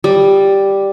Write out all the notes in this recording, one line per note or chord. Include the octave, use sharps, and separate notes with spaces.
G3